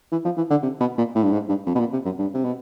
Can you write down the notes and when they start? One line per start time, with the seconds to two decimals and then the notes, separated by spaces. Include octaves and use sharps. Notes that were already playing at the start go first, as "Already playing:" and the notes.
0.12 E3
0.25 F3
0.37 E3
0.51 D3
0.63 C3
0.80 B2
0.98 A#2
1.16 A2
1.23 G2
1.33 G#2
1.49 G2
1.67 F2
1.75 B2
1.80 A#2
1.93 C3
2.06 F#2
2.19 G2
2.34 C3
2.44 B2